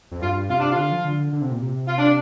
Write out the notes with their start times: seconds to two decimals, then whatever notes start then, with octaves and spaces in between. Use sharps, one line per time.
0.11 F2
0.21 G2 F4
0.49 C3 F4
0.59 D4
0.71 F4
0.76 D3
0.92 F3
1.05 D3
1.32 D3
1.42 C3
1.51 A#2
1.62 C3
1.87 F4
1.98 D4